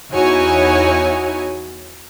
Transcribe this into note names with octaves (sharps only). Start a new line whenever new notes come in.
E2 D#4 E4 F#4 C#5 G#5